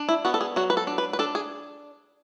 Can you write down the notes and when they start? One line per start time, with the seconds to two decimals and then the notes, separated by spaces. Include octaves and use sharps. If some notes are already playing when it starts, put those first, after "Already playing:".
Already playing: D4
0.09 E4
0.25 B3 F#4
0.34 A4
0.41 G#4
0.56 F#3 F#4
0.70 B4
0.77 A4
0.87 D4
0.98 B4
1.13 B4
1.19 D4 A4
1.35 G#4